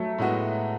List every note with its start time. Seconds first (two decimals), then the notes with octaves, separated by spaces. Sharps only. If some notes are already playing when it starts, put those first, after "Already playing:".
Already playing: F#3 A3
0.19 A2 G#3 B3 F#4